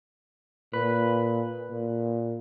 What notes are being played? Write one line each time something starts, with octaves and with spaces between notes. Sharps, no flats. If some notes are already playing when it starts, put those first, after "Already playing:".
A#2 B4
A#2